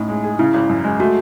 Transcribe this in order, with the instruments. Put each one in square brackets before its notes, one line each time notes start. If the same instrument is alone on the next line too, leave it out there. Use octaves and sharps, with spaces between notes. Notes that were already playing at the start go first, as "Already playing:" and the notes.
Already playing: [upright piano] A2 C#4 D#4
G#3
G#4
[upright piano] C#3 [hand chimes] E4
[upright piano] G#1
F#2
G#3
[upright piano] A3 [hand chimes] F#4